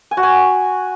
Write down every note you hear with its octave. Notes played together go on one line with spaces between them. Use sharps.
G#5
F#4
G#5